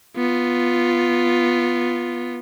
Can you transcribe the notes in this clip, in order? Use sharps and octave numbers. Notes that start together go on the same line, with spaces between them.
B3 F4